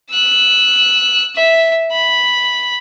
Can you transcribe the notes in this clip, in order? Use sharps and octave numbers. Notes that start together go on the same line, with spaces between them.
E6 F#6
E5
B5